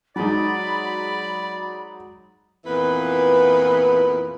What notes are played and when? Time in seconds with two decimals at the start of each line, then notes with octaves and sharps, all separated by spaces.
0.16 F#3 G#3 D#4 D5 B5
2.65 F2 A#2 E3 B3 B4